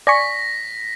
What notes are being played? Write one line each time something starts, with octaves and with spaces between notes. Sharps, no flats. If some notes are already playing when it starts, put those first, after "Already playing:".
D5 G#5 C#6 A#6 B6